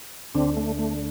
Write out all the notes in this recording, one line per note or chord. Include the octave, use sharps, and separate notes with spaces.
D2 D3 C4 D4
A3
A3